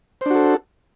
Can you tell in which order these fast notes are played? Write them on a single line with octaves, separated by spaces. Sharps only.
C5 D4 F#4 A4